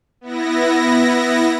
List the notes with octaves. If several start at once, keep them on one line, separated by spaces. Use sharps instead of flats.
B3 E4 A#6